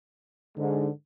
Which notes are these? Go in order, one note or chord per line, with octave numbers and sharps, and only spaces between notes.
G#2 D3